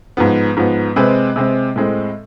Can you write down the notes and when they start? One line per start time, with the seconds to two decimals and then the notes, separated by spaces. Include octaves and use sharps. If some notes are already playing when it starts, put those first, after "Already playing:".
0.17 G#2 F3 B3
0.56 G#2 F3 B3
0.96 C3 G#3 C4 B4
1.36 C3 G#3 C4
1.76 A2 G#3 C4